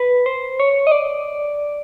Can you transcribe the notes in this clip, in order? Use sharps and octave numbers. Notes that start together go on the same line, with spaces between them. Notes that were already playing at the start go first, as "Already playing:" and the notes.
Already playing: B4
C5
C#5
D#5
D5